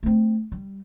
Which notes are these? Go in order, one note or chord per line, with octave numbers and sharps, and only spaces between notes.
A3 C4
G3